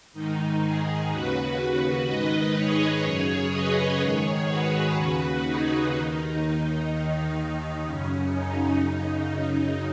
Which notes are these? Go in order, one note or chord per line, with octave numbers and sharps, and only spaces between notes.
G#2 D#3 D#4
D#4 G#4
D#2 C#3 F#4 B4
F#4 B4
G#2 D#3 B4 D#5
G#4 C#5
F#2 C#3 G#4 C#5
B4 D#5
G#2 D#3 G#4 C#5
F#4 B4
D#2 C#3
D#4 G#4
D#2 D#3 D#4
D#2 D#3
F#2 C#3 C#4
D#4
F#2 C#3